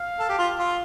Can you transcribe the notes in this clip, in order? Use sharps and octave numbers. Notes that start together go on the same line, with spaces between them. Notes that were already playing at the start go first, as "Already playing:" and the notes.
Already playing: F5
A4
G4
F4
F4